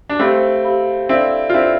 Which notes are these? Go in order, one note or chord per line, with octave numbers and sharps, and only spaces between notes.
D4
A3 C4 G4 C5 F5 B5
G4 C5 F5 B5
C4 D4 E4 A4 D5 F5
F4
C4 D4 E4 A4 D5 F5